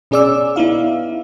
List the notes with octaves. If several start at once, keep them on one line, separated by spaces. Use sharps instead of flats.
B2 C#4 G#4 D5 D6 E6
B3 D#4 E4 F5